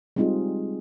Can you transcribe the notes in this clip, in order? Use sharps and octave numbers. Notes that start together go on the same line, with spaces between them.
G3 G#3 C4 D#4 F4 G#4